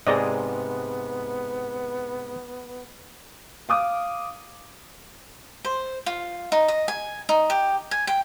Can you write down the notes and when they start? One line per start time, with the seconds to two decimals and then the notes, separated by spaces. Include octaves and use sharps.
0.07 G#2 C3 B3 G#4 D5 D#5
3.69 F5 D6 D#6
5.65 C5
6.06 F4
6.52 D#4
6.68 D#5
6.88 G#5
7.29 D#4
7.50 G4
7.91 G#5
8.07 G5